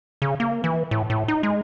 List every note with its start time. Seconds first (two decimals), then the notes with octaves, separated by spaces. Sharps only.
0.22 C#3
0.40 A#3
0.64 E3
0.91 A2
1.10 A2
1.28 D#4
1.43 G#3